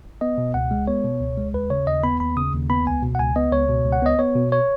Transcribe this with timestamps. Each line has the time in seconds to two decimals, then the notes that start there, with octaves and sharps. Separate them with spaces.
0.21 B3 D#5
0.38 B2
0.54 C#2 F#5
0.71 G#3
0.87 B3 C#5
1.04 B2
1.21 C#2
1.37 G#3
1.54 D#2 B4
1.70 C#3 C#5
1.87 D#2 D#5
2.03 B3 B5
2.20 D#2 B5
2.36 C#3 D#6
2.53 D#2
2.70 B3 B5
2.86 C#2 G#5
3.03 B2
3.15 F#5
3.19 C#2 G#5
3.36 B3 D#5
3.52 C#2 C#5
3.69 B2
3.85 C#2
3.92 F#5
4.02 B3 D#5
4.19 B3 C#5
4.36 B2
4.52 C#5